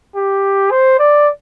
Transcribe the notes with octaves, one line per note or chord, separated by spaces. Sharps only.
G4
C5
D5